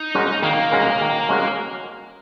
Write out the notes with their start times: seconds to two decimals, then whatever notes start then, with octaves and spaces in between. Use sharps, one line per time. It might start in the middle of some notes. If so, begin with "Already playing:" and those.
Already playing: D#4
0.15 G#3 C#4 F#4 A#4
0.42 D#3 A#3
0.72 G#3 C#4 F#4 A#4
1.01 D#3
1.29 G#3 C#4 F#4 A#4